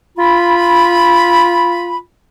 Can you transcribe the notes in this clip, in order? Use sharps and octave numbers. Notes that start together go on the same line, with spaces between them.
F4 B5